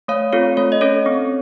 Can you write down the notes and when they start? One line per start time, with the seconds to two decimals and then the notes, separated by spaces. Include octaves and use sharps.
0.08 A3 C#5 F5
0.33 C4 F4 A4 C#5
0.57 A3 C#5
0.72 D#5
0.81 C#4 A4 C#5
1.06 C4